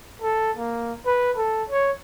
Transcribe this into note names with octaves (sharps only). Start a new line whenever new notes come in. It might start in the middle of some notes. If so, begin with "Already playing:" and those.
A4
A#3
B4
A4
C#5